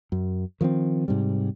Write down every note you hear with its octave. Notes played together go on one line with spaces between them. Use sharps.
F#2
D#3 F3 B3 C4
G#2 C3 G3